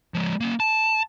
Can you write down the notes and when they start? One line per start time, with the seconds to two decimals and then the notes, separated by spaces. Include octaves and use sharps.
0.14 F3 G#3
0.41 A#3 C#4
0.60 A5